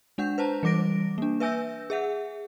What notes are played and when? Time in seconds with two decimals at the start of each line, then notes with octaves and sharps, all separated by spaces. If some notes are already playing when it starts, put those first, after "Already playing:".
0.18 G#3 D4 F#5 G6
0.38 B4 C5 A5 A#5
0.63 E3 G3 D6 A#6 D7
1.18 A#3 D4
1.40 B4 E5 G#5 E6 G6 A#6
1.90 G#4 E5 F#5